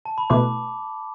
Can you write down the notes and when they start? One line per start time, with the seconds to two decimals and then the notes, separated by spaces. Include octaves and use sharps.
0.05 A5
0.18 B5
0.30 B2 A3 E4 B4 D6